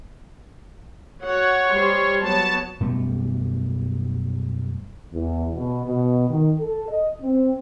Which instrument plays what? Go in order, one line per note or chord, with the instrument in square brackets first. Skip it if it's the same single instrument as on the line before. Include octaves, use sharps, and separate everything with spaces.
[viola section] F#4 F#5 [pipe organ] C#5
[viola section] G3 C5 C6
[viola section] F#3 B3 C#5 [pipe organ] A5
[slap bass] F#2 B2 G3 A3
[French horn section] E2
B2
B2
D#3
A4
D#5
C4